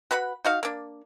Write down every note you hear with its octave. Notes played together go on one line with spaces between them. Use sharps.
F#4 B4 F#5 B5
D#4 F#4 F5
A#3 D4